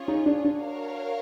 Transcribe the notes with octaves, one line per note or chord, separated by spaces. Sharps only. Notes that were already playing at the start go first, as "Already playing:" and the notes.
Already playing: C#4 F4 G#4 C#5
D#4
D4
D4
F#4 A#4 C#5 F5